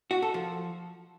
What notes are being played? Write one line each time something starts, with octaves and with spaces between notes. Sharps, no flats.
F#4
A4
F3